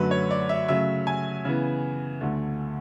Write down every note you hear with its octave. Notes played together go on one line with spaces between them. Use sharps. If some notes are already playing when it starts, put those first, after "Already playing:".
Already playing: F#2 D3 F#3 A3 B4
C#5
D5
E5
C#3 F#3 A3 E5
G#5
C#3 E3 B3
D2 D3 A3